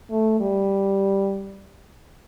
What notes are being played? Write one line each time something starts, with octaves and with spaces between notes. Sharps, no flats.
A3
G3